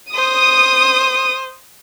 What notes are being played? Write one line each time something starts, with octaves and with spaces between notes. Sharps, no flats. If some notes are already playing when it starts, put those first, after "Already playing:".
C5 D#6